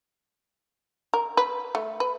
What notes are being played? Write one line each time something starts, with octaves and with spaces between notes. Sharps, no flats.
A#4
B4
A3
B4